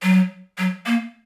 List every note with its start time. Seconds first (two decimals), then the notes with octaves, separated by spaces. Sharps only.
0.03 F#3
0.58 F#3
0.86 A#3